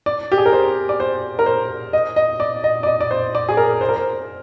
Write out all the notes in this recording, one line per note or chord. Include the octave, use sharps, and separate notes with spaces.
D5
G4
G#4
A#4
C5
D5
C5
A#4
C5
D#5
D#5
D5
D#5
D5
D#5
D5
C5
D5
G#4
A#4
C5
A#4
C5